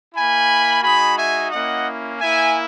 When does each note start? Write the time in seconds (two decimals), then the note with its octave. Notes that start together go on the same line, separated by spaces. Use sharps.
0.14 A#3 E4 G#5 B5
0.82 G#3 D#4 F#4 G#5 B5
1.16 E5 G#5
1.51 A#3 C#4 E4 D#5 F#5
2.19 A#3 E4 E5 G#5